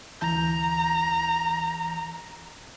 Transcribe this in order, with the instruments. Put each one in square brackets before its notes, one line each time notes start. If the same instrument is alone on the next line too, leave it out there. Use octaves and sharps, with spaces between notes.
[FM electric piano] D2 E3 G6 [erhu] A#5